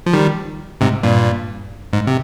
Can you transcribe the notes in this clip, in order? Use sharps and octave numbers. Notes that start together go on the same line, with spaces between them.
F3
D#3 G3
G#2 C3
G2 A#2
G#2
C3